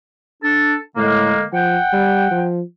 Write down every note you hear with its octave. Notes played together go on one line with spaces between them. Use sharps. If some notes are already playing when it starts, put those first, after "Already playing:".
D4 A4
A2 D3 G#3 A#3
F3 F#5 G5
G3
F3